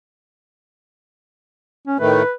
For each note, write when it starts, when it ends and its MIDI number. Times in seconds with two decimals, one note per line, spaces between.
1.87 2.00 61
2.00 2.23 45
2.00 2.23 51
2.00 2.23 57
2.00 2.32 71